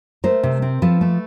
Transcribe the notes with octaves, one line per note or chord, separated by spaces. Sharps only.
A3 A#4 C5
C3
C4
F3 A4 B4
A3